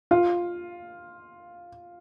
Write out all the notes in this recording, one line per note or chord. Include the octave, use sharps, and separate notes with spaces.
F4